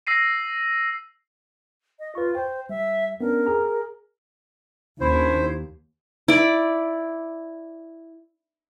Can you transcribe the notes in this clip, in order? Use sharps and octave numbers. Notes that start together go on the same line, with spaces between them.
E6 A#6 C7 D#7
D#5
F4 B4 C#6
C5 G5
G3 E5
B3 C#4 D4 A#4
G#4 A#5
D#2 C#4 D4 E4 C5
E4 D5